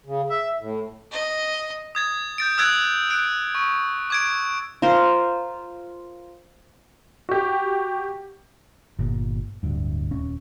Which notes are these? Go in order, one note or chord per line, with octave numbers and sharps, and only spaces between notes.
C#3
E5
A2
D#5
D#6 G#6 A6
G6 A6 D7
D#6 E6 F#6 G#6 A6 D7
F#6 D7
C#6
D6 G#6 D7
F4 A#4 C5
F#4 G4
G1 A#2
D1 D2 G2
D#1 C#4